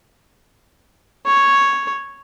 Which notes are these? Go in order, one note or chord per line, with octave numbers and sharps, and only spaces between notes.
C#5